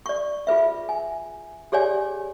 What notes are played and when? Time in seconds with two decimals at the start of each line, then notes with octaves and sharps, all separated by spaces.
0.06 D5 C#6
0.47 F4 G#4 B4 E5
0.89 G#5
1.72 G4 G#4 C#5 D5 G#5